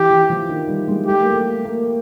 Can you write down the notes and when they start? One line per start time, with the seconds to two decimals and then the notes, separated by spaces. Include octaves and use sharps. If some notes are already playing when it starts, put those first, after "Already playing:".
Already playing: E3 G4
0.10 E3
0.30 F3
0.49 D#3
0.68 G3
0.88 G#3
1.06 A3 G4
1.20 A#3
1.33 A3
1.65 A#3